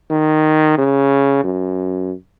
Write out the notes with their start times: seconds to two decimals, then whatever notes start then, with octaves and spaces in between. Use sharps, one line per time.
0.11 D#3
0.78 C#3
1.44 F#2